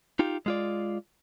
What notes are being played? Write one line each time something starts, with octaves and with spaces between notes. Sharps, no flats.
D#4 F4 G4
G#3 F4 D5